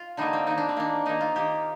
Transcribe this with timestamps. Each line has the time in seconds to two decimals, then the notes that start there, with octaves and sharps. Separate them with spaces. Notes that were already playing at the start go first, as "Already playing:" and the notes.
Already playing: F4
0.17 D3 G3 A#3 D#4
0.33 C4
0.47 D#3 A#3 D#4
0.58 D4
0.69 C4
0.76 D#3 A#3 D4
1.06 D#3 A#3 D#4
1.21 F4
1.35 D#3 A#3 G4